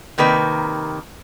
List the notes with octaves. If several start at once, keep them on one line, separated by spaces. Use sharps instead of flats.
C3 D#3 A#3 B4